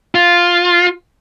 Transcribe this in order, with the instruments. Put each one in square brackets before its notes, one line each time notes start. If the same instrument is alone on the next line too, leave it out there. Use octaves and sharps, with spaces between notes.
[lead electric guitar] F4